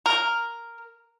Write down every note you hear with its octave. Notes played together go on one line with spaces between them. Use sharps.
A#4